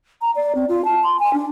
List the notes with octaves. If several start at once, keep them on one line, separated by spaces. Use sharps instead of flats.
A#5
D5
C4
F4
A5
C6
G#5
D4